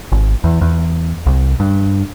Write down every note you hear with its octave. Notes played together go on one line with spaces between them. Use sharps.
G#1
E2
E2
C2
G2